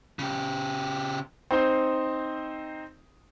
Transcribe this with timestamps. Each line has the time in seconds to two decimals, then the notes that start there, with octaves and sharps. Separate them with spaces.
0.19 C#3 G4
1.51 C4 D#4 C5